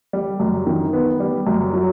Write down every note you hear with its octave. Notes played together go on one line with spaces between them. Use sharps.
G3
F#2
D#3
B3
G3
F#2
F#3